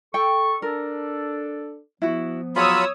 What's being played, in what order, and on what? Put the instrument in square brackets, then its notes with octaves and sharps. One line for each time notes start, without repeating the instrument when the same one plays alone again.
[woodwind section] A4 C#6 [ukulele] G5
[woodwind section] D4 A4 D5 [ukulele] A#4
[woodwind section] F3 B3 [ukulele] E4 F#4
[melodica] F#3 F4 B5 [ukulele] G#4 [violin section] C#5 D#6 E6